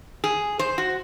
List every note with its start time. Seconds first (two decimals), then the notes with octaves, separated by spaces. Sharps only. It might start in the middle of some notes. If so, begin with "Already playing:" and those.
0.24 G#4
0.59 C5
0.78 F#4